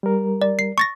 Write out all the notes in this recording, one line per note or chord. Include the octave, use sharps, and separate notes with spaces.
G3 A#4
D5
C7
C#6 A6 A#6